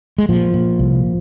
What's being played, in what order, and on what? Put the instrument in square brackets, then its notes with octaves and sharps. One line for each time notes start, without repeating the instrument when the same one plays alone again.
[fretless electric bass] G#3
A#2 F3
A#2
C2